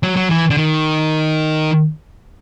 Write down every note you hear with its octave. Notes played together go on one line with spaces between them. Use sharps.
F#3
F#3
E3
D3
D#3